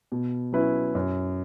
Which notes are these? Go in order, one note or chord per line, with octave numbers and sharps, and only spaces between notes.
B2
F#3 C#4 E4 B4
F#2